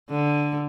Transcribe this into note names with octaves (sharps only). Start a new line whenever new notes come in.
D3